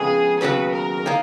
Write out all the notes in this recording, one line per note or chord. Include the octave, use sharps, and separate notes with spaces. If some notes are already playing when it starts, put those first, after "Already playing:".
Already playing: F2 C#3 G#3 B3 G#4
D#2 C#3 F#3 B3 F#4 B4
A#4
D#3 A#3